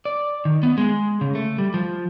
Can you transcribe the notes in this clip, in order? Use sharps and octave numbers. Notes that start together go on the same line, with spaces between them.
D5
D#3
B3
G#3
C#3
A3
G3
F3